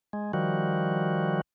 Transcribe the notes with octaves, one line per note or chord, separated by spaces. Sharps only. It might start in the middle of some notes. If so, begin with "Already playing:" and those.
G#3
D#3 F3 G3 F#4